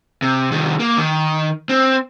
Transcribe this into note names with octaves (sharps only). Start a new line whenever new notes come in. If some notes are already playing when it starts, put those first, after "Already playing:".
C3
C2 D#3
A#3
D#3
C4